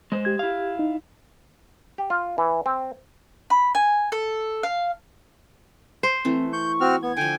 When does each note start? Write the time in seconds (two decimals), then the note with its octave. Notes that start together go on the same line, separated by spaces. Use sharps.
0.12 G#3 C5
0.25 G4 G#6
0.39 E4 F5
0.79 D#4
1.98 G4
2.10 F4
2.38 E3
2.66 C4
3.50 B5
3.75 G#5
4.12 A4
4.63 F5
6.03 C5
6.25 E3 A3 C4
6.53 C#6 G6
6.81 C4 F#4 F6
7.03 B3 G#6
7.17 D3 F3 G5 G#5